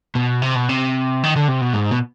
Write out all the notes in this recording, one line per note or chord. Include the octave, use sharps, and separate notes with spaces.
B2
C3
B2
C3
D#3
D3
C3
B2
G#2
B2